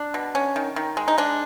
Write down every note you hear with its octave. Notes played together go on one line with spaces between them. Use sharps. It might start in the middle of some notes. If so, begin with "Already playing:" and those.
Already playing: D4
B2
C#4
D#3
D#3
G#3
D#4
G#3 D4